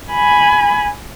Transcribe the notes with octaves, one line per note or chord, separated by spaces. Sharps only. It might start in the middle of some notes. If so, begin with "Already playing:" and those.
G#5 B5